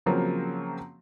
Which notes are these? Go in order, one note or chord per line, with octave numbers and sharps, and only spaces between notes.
C#3 F3 F#3 A#3 C4